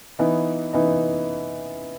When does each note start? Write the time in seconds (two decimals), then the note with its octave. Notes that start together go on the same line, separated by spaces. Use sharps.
0.19 E3 B3 D#4
0.73 E3 B3 D#4